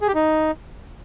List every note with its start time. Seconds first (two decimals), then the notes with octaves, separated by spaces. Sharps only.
0.01 G#4
0.08 G4
0.15 D#4